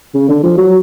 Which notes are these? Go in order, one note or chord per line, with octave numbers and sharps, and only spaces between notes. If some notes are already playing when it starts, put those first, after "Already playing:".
C#3
D3
F3
F#3